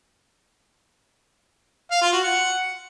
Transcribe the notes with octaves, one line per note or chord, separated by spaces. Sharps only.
F5
F4
F#4
F#5